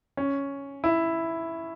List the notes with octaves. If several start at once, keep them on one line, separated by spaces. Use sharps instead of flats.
C#4
E4